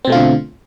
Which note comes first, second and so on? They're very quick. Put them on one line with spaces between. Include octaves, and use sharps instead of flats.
C4 B2 A3 F4 D3